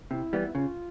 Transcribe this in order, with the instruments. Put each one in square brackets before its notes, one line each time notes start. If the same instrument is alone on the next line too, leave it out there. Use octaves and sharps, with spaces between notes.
[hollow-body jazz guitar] C3 [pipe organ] E4
[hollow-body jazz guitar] E3 G3 B3
[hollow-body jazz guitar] C#3 [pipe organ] F4